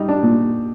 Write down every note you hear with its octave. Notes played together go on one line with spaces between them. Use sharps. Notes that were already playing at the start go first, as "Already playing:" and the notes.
Already playing: G3 D#4
D4
A#2